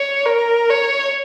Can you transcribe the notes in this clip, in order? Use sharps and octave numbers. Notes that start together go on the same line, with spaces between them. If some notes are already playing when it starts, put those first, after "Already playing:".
Already playing: C#5
A#4
C#5